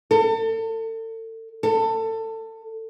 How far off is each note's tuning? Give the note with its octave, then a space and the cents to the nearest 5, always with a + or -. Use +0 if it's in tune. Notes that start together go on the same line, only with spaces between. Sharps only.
A4 +35
A4 +25